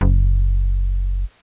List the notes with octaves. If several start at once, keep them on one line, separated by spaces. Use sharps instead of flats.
F#1